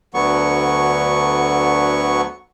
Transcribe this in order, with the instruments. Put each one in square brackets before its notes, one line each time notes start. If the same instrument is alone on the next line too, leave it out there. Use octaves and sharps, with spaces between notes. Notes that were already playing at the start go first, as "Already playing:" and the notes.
[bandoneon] D2 D3 F#3 B3 C#6